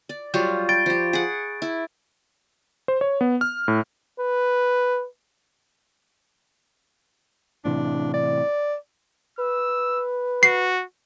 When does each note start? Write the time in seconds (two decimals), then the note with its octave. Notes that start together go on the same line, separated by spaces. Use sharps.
0.09 D5
0.34 F#3 G3 F4 C#6 G6
0.69 G5 B5 A6 D7
0.86 F3 G4
1.13 G#4 F#5
1.62 E4
2.88 C5
3.01 C#5
3.21 B3
3.41 F6
3.68 A2
4.20 B4
7.65 A2 C3 E3 D4
8.14 D5
9.39 B4 E6
10.43 F#4 C7